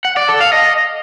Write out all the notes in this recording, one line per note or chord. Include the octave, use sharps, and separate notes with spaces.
F#5
D5
A4
F5
D#5